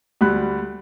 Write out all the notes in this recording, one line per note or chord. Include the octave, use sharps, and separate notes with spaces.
D2 G3 B5 F#6